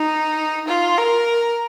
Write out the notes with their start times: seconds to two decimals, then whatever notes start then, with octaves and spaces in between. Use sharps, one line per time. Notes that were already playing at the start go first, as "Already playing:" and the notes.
Already playing: D#4
0.68 F4
0.98 A#4